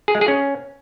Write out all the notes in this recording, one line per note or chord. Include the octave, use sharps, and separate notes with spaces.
G#4
G#3
G#4
C#4